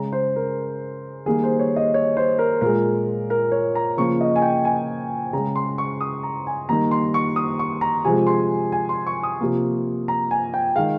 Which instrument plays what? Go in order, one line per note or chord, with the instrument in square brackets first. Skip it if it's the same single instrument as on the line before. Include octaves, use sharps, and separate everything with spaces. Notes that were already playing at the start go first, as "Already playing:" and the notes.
Already playing: [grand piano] C#3 G#3 A#5
C5
A#4
D#3 G3 A#3 G#4
C5
C#5
D#5
C#5
C5
A#4
A#2 G#3 A#4
A#4
C#5
A#5
C#3 F3 A#3 C#6
D#5
G#5
G5
G#5
C#3 G#3 A#5
C6
C#6
D#6
A#5
G#5
D#3 G3 A#3 A#5
C6
C#6
D#6
C#6
A#5
C3 F3 G#3 G#5
C6
G#5
C6
C#6
D#6
C3 F3 A#3
A#5
G#5
G5
D#3 G#3 F5